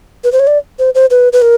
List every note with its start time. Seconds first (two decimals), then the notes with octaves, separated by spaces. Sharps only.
0.24 B4
0.32 C5
0.40 C#5
0.47 D5
0.79 C5
0.95 C5
1.11 B4
1.33 B4
1.42 A#4